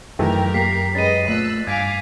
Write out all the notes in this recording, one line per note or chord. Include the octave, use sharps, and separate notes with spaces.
F#2 D#3 E3 A3 G4 A#4
A#3 B6 C7
G#3 C#4 B4 D#5 A6 D#7
A#2 A3 E6 F#6
G2 F5 G#5 D6 G#6 B6 D7